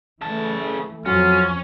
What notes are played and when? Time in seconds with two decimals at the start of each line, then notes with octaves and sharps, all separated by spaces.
0.22 C#3 E3 A3 A5
1.06 F2 F#3 C#4 F4